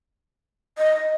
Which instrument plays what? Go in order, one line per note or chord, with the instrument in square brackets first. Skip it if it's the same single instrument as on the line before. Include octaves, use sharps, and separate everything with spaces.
[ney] D#5